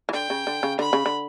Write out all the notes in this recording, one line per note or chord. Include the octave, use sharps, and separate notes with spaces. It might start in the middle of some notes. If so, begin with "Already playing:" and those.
E3
D3 G5
C#3
D3
C#3
D3 B5
C#3
D3